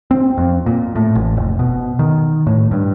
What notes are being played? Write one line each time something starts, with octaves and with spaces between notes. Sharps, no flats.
C4
F2
A#2
A2
A1
F1
B2
D#3
A2
G2